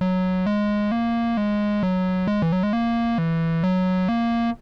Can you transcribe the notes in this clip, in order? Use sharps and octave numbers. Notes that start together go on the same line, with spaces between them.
F#3
G#3
A#3
G#3
F#3
G#3
E3
F#3
G#3
A#3
E3
F#3
A#3